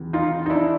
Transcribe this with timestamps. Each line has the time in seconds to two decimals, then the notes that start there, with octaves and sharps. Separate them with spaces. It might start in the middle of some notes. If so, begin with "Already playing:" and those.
Already playing: E2 C3 D#3 F#3
0.13 D#4 F4
0.46 D#4
0.50 D4 E4